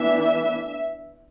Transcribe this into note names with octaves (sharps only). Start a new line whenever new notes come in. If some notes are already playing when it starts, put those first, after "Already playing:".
Already playing: E3 B3 D4 E5